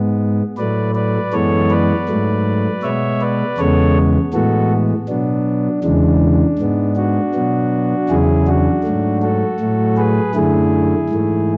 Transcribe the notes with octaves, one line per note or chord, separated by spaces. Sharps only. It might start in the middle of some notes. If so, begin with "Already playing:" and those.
Already playing: G#2 G#3 B3
A2 F#3 A3 B4 D5
B4 D5
F#2 E3 G#3 B3 A4 C#5
B4 D5
G#2 F#3 A3
B2 G#3 B3 C#5 E5
B4 D5
E2 C#3 G#3 B3 A4 C#5
A2 E3 G#3 B3 F#4 A4
B2 F#3 B3 D4
E2 C#3 E3 G#3 D4
G#2 G#3 B3
D4 F#4
B2 F#3 B3
E2 C#3 F#3 E4 G#4
D4 F#4
G#2 F#3 A3
F#4 A4
A2 F#3 A3
G#4 B4
F#2 D3 A3 E4 G#4
G#2 E3 A3